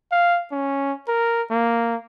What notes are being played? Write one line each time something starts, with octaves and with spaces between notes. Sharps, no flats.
F5
C#4
A#4
A#3